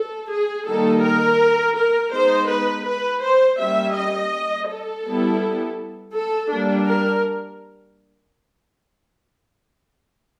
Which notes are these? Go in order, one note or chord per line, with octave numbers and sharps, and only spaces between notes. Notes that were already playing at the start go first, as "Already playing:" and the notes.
Already playing: A4
G#4
D#3 G3 A#3 D#4 A4
A#4
A#4
G#3 B3 D#4 C5
B4
B4
C5
G3 A#3 C#4 E5
D#5
A4
G3 B3 E4
A4
G3 A#3 D4
A#4